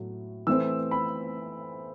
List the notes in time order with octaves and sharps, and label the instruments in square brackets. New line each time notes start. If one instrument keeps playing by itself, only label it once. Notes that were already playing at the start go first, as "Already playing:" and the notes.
Already playing: [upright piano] A2 F#3 A3
E3 A3 C4 E6
B5